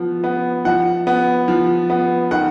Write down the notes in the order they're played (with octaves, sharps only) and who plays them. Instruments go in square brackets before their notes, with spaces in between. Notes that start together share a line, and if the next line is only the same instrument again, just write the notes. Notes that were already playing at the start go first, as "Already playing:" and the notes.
Already playing: [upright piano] F3 B3
B3
F3 F#5
B3
F3
B3
D#3 F#5